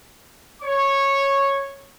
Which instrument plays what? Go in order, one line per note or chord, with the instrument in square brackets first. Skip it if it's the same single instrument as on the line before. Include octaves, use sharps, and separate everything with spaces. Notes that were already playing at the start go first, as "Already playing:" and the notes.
[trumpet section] C#5 C#6